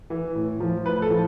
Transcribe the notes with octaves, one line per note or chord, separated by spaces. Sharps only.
E3
A2
F3
A2 B4
A4
F3